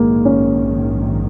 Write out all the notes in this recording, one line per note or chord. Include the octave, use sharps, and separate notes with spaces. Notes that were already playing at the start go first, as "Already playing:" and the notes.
Already playing: A#1 G#2 D#3 G#3 A#3
C#4